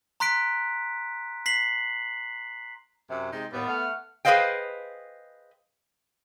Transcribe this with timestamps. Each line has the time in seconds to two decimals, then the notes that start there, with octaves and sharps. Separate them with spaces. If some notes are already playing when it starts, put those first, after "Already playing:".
0.20 A#5 C6 F#6 B6 D7
1.46 B6 C7 F#7
3.10 F#2 C3
3.33 C3 G#3 D#4
3.53 D#2 A2 G3 B3
3.68 A3 F#5 F6
4.25 G#4 B4 C5 D#5 F5 G5